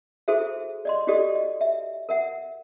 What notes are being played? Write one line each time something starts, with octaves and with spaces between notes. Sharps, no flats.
E4 F#4 G#4 A4 C5 E5
D5 D#5 C6
E4 F#4 G4 A4 D5 D#5
D#5
E5
A#4 E5 F#5